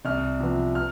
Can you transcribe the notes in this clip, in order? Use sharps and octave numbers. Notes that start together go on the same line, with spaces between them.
C2 F6
C3 F3 B3
F6